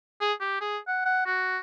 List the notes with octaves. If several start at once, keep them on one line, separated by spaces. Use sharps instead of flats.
G#4
G4
G#4
F#5
F#5
F#4